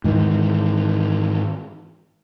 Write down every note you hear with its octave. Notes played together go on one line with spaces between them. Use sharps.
G#2 D#3 E3